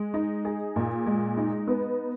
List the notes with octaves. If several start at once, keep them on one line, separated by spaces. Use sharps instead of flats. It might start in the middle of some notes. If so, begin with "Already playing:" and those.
Already playing: G#3
D#4
G#4
A#2
G#3
D#4
B3